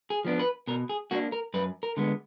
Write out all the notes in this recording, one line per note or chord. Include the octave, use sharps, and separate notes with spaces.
G#4
F3 B3 D4
B4
B2 A#4
G#4
A#3 D4 F#4
A#4
F#2 B4
A#4
D3 G#3 B3